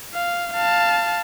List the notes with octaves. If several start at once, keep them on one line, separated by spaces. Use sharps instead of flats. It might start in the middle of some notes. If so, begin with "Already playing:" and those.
F5
F5 A5